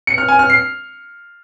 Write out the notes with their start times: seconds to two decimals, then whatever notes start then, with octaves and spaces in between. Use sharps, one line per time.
0.07 C#7
0.18 F6
0.28 G#5
0.39 F6
0.50 C7